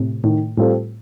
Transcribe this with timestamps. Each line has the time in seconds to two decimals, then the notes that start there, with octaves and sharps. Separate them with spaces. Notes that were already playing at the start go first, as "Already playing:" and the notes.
Already playing: A2 C3
0.24 A2 D#3
0.57 A2 G3 C4 F4 A4